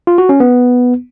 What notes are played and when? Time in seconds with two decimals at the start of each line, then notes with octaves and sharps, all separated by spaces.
0.07 F4
0.18 F#4
0.29 C#4
0.40 B3